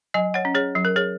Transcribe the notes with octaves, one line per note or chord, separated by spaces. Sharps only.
F#3 D#5 G#5
C#5 F#5
C#4
G#4 C#5
F#3
A#4
G#4 C#5